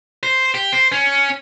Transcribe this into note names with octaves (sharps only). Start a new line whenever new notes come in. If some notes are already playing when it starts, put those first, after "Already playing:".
C5
G4
C5
C#4